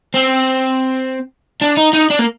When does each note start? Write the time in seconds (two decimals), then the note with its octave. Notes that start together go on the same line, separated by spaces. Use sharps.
0.14 C4
1.62 D4
1.77 D#4
1.94 D#4
2.11 D4
2.19 A#3